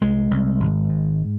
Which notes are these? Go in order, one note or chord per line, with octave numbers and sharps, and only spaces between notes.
C2 G#3
C2
G#1
G#2